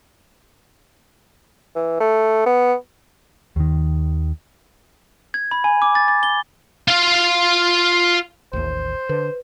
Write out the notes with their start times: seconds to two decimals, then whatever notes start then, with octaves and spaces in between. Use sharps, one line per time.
1.75 E3
2.00 A3
2.46 B3
3.56 D#2 D#3
5.34 G#6
5.51 B5
5.64 G#5
5.82 D6
5.95 A6
6.08 A6
6.23 G7
6.88 F4 F5
8.53 A1 D#2 C5
9.09 D3 B4